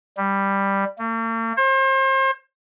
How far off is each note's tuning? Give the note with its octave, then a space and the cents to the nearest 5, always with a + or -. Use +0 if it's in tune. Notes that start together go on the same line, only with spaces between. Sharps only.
G3 +5
A#3 -45
C5 +35